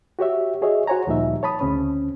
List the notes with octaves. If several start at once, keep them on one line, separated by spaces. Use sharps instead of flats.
F#4 G4 C#5 E5
F#4 G#4 C#5 D#5 E5
F#4 C5 C#5 G#5 A#5
D2 A#2 F3 G3 D#4 E5
C#5 A5 B5 D#6
D2 C#3 C4 C#4